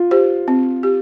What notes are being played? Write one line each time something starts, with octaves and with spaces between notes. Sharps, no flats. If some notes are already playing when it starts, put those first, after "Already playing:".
Already playing: F4
G4 C5
C4
G4